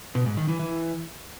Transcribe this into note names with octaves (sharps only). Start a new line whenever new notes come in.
B2
G#2
D#3
E3
E3